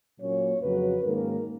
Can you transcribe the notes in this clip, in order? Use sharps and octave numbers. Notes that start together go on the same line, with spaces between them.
A#2 F#3 A#3 C#4 C#5
F2 C#3 F#3 C#4 B4
G#2 D#3 A#3 C#4 A#4